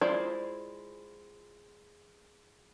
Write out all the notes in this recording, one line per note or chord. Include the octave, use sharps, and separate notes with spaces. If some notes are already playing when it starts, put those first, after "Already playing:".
G#3 E4 F4 C5 D5